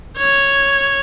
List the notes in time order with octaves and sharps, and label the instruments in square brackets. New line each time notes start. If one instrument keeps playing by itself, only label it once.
[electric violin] C#5